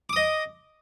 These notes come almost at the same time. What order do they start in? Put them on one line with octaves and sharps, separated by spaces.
D6 D#6 D#5